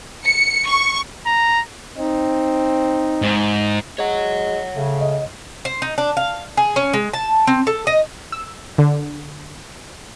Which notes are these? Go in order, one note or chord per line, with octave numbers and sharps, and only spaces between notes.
C#7
C#6
A#5
C4 D#4
G#2
G#3 C#5 F#5
C#3 A3
D#5
C5
D#4
D4
F5
G#4
C#4
G#3
A5
C4
A4
D#5
E6
D3